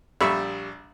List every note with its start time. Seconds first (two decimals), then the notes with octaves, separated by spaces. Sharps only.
0.21 A#1 G3 E5 B5 C#6